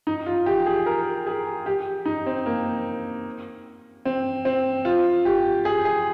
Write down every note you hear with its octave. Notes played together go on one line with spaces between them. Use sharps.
D#4
F4
G4
G#4
A#4
G#4
G4
D#4
C4
A#3
C4
C4
F4
G4
G#4
G#4